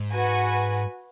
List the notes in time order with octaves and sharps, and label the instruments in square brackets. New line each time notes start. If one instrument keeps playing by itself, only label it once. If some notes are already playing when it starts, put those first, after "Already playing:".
Already playing: [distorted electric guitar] G#2
[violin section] F#4 B4 G#5